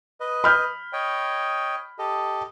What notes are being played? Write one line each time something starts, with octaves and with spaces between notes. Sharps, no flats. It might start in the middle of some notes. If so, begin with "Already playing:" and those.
B4 D#5
B5 F6 G6
C#5 D#5 G5
G4 A4 D#5